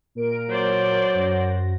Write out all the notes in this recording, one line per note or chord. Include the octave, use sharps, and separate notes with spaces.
A#2 A#4 D7
F#3 C5 D5
F#2 F#4 A#6